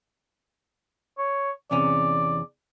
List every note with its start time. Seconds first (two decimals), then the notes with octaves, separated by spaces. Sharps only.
1.18 C#5
1.71 E2 C3 C#4 D5